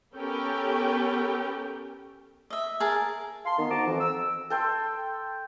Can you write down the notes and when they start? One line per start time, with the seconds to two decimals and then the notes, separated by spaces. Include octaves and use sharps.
0.14 B3 C#4 G4 A4 A#4 G5
2.50 D#5 E5
2.80 G#4 A#4 A5
3.45 F5 A5 C6
3.57 D#3 B3
3.69 F#4 C5 A5 A#5 D6
3.85 F2 E3
4.00 E6
4.50 A4 G5 C6